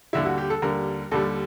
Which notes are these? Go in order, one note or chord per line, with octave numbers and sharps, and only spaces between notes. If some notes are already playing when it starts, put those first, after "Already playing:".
D#2 D3 G3 E4
F#4
G4
A4
D#2 D3 G3 A#4
D#2 D3 G3 A4